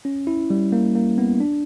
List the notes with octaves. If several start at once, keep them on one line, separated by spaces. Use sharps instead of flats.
C#4
E4
G3
A#3
A#3
B3
D4